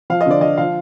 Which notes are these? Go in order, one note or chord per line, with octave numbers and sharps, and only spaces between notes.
F3 F5
D#5
D3 D5
F3 D#5
F3 F5